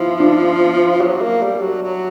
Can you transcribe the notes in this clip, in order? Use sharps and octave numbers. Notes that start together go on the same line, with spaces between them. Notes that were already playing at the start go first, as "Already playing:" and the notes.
Already playing: F3 E4
D4
F#3
A#3
G3
F#3
F#3